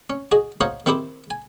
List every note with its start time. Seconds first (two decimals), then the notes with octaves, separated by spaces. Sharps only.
0.10 C#4
0.32 F#4 G#4 D#5
0.61 D#4 F#4 C5 C#5 D#5 F5
0.86 D#3 C4 E4 G4 C5
1.30 G#5